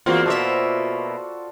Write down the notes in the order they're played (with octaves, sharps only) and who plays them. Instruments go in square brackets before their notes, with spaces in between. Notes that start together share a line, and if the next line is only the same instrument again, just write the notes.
[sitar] E2 A#3 C4 [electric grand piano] F4 F#4
[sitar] B2 A#3 E5 [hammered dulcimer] A4 C5 D5